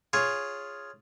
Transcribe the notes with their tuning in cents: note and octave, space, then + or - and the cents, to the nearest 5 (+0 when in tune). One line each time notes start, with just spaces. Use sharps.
F4 +0 G#4 +0 C#5 +0